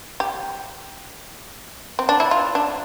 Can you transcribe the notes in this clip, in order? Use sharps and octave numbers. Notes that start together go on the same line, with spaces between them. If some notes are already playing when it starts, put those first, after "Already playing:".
G4
C4
D4
E4
F4
D4